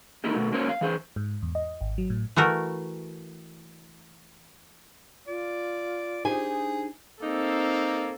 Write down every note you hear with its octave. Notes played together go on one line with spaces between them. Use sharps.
A3 A#3 D#4 E4 G4
B2 A3
F#3 A#3 C#4 C5 C#5
F5
E3 G#4 C5
G#2
E2
D#5
G#1
F#3
A2
E3 A3 F#4 A#4
F4 D5
D4 D#4 G4 G#4 C5 G#5
A#3 C4 D#4 A4